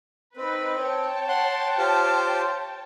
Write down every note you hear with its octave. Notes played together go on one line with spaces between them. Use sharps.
C4 D#4 B4
C#5 G5 A5
F#5 C6
F4 G4 C5